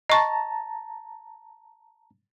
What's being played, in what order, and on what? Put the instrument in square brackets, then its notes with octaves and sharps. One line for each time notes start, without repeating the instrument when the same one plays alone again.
[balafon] D#5 C#6 [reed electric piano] A5 A#5